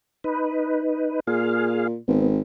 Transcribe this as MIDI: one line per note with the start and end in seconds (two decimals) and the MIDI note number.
0.24 1.20 63
0.24 1.20 71
1.27 1.96 46
1.27 1.87 68
1.27 1.87 77
2.08 2.40 32
2.08 2.30 59